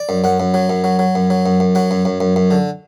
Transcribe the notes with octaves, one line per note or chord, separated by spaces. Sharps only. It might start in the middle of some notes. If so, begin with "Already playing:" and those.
Already playing: D5
F#2
F#2 F#5
F#2
F#3
F#2
F#3
F#3
F#2
F#3
F#2
F#2
F#3 F#5
F#2
F#2
F#2
F#2
D3